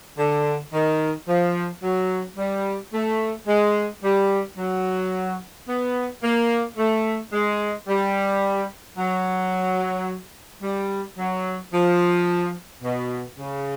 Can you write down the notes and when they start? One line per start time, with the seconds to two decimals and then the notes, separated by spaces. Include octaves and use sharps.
0.18 D3
0.73 D#3
1.27 F3
1.83 F#3
2.37 G3
2.93 A3
3.48 G#3
4.03 G3
4.58 F#3
5.68 B3
6.23 A#3
6.78 A3
7.33 G#3
7.88 G3
8.98 F#3
10.63 G3
11.18 F#3
11.73 F3
12.83 B2
13.38 C#3